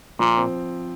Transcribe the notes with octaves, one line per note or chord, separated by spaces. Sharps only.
A#2 F3
C4